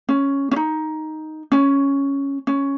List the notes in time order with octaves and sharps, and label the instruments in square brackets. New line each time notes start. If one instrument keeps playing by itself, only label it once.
[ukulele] C#4
C#4
D#4
C#4
C#4